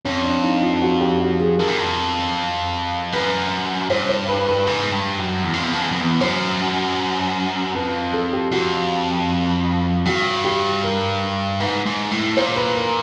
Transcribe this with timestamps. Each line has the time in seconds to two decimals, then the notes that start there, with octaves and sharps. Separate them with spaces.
0.05 F2 C#4
0.24 D4
0.43 D#4
0.62 F4
0.82 F#4
1.01 G4
1.20 F#4
1.40 G#4
1.58 F2 A#4
1.68 F#2
1.78 F2
3.13 F#2 B4
3.90 G2 C5
4.09 C5
4.28 B4
4.48 B4
4.67 G#2 B4
4.92 G2
5.19 F#2
5.44 E2
5.54 F2
5.64 E2
5.73 F2
5.82 E2
5.92 F2
6.01 E2
6.20 F#2 C5
7.74 F2 B4
8.13 A4
8.33 G4
8.51 F2 F#4
10.05 G2 F#4
10.44 G4
10.84 A#4
11.60 G#2 B4
11.86 G#2
12.11 A2
12.37 A#2 C5
12.56 B4
12.76 A#4